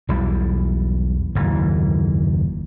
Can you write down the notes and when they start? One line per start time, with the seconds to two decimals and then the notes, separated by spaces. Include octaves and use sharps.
0.09 B1 E2 E3 G3
1.35 F#1 D#2 G#2 E3